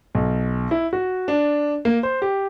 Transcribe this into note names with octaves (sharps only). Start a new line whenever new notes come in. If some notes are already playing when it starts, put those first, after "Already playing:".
B1
E4
F#4
D4
A#3
C5
G4